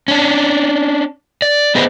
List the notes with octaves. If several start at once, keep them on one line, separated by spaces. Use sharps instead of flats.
C#4 D4
D5
B3 G#4 B4 C5 D#5